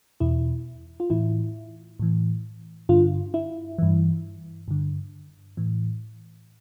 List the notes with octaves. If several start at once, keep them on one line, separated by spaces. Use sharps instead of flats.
E2 B2 E4
F4
A2 E3 E4
A2 E3
G2 D3 F4
E4
G2 E3
G2 D3
A2 E3